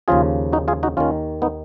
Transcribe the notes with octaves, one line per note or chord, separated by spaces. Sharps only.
D#2 C#3 F3 F4 G#4
D#4 F#4
F4 G#4
D#4 F#4
D#2 D#3 C#4 F4
B3 D#4